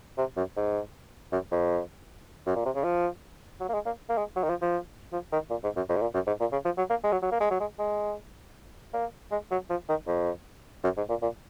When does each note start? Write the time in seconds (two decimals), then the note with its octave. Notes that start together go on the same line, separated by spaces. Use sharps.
0.18 C3
0.37 F#2
0.57 G#2
1.32 F#2
1.52 F2
2.46 F#2
2.56 A#2
2.66 C3
2.76 C#3
2.84 F3
3.60 F#3
3.69 A#3
3.74 G#3
3.86 A#3
4.10 A#3
4.18 G#3
4.36 F#3
4.44 D#3
4.50 F3
4.62 F3
5.13 F3
5.32 D#3
5.50 A#2
5.64 G#2
5.76 F#2
5.89 F2
5.96 G#2
6.02 A#2
6.14 F#2
6.27 G#2
6.40 A#2
6.52 C#3
6.65 F3
6.78 F#3
6.90 A#3
7.04 G#3
7.12 F#3
7.22 F#3
7.32 A#3
7.41 G#3
7.51 F#3
7.60 G#3
7.79 G#3
8.94 A#3
9.31 G#3
9.51 F#3
9.70 F3
9.89 D#3
10.07 F2
10.84 F#2
10.97 G#2
11.10 A#2
11.22 A#2